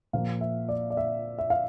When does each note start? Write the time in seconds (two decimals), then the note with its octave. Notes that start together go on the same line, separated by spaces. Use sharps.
0.13 A#2 F3 A#3 F5
0.41 E5
0.69 D5
0.90 D5
0.97 E5
1.39 E5
1.50 F5